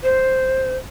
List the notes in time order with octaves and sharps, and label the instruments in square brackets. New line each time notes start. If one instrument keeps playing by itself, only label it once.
[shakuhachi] C5